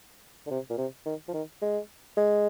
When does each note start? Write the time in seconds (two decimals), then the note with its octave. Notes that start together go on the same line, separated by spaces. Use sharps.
0.46 D3
0.50 C3
0.70 A#2
0.78 C3
1.06 D#3
1.28 F3
1.34 D#3
1.62 G#3
2.17 G#3